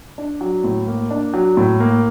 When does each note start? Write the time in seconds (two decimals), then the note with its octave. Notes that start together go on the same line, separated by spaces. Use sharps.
0.18 D4
0.41 F#3
0.64 A2
0.87 A#3
1.10 D4
1.34 F#3
1.57 A2
1.80 A#3